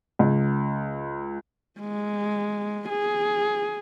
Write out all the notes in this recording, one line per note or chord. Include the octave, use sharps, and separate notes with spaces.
C#2
G#3
G#4